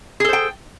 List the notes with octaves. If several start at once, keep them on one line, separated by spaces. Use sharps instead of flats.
G#4 A4 C5 G5